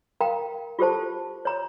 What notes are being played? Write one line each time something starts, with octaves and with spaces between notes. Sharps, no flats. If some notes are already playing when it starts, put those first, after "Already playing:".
A#4 F5 G5 A#5
F4 G4 A4 C5 A5
C#5 A#5